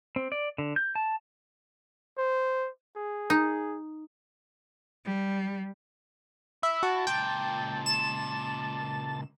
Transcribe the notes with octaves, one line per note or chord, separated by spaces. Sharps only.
C4
D5
D3
G6
A5
C5
G#4
D#4
G3
E4 E5
F#4 A5
C#2 A#2 G5
E7